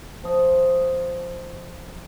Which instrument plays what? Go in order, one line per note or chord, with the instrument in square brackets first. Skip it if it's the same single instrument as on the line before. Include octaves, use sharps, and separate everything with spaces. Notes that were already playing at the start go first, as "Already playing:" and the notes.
[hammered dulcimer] F3 D#5